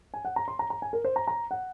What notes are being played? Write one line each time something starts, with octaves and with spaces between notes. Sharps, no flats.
G#5
F#5
A#5
C6
A#5
A#5
G#5
A#4
C5
A#5
A#5
F#5